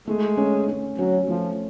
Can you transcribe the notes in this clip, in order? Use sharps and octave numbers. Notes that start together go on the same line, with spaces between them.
G#3 A3
C#4
C#4
F#3 C#4
F3 A3